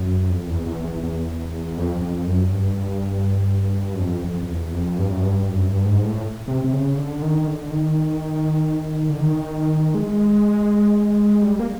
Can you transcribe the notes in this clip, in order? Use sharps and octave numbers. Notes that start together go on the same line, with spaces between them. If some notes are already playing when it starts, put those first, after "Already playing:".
Already playing: F#2
F2
E2
E2
E2
E2
F2
F2
F#2
G2
F#2
F2
F2
F2
E2
F2
G2
F#2
G2
F#2
G2
G#2
A2
C3
C3
C#3
D3
D#3
D3
D#3
D3
D#3
G#3
G3
A#3